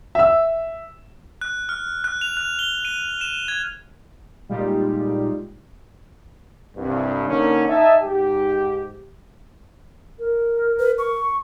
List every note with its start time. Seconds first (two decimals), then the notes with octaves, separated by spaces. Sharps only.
0.15 E5 E6
1.41 F#6
1.69 F6
2.04 F#6
2.21 F7
2.37 F#6
2.59 G7
2.85 D#7
3.21 E7
3.48 G#6
4.49 A#2 G3 G#3 D#4 F4 G4
6.77 C2 G2
7.27 D3 A#3 C#4 D#4
7.68 D#4 E5 G#5 A5
8.03 G#2 G4
10.19 A#4
10.79 B4
10.98 C#6